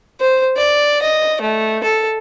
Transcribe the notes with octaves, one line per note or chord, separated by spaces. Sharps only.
C5
D5
D#5
A3
A4